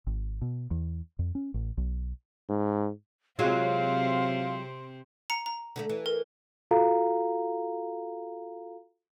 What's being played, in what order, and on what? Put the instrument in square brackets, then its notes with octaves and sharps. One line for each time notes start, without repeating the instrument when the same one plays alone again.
[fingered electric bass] G#1
B2
E2
F2
C#4
A1
B1
[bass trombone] G#2
[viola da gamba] C3 C4 [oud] F#3 G#3 F4 [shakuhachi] F5
[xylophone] A#5 C#7
A#5
[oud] D3 G3 A3
E3
[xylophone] A#4
[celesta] F4 F#4 A4 F5 A#5